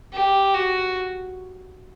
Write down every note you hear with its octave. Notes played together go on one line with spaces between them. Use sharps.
G4
F#4